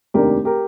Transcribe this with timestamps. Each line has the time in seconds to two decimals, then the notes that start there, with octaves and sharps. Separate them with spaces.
0.14 F1 D#2 D#3 A#3 D4 G4 A#4
0.45 G4 A#4